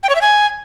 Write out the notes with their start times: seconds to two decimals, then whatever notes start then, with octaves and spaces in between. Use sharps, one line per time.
0.03 G5
0.09 C#5
0.15 E5
0.21 G#5